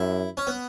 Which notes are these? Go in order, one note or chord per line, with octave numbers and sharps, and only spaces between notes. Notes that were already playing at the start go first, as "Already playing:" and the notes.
Already playing: F#2 E4
C#4
B3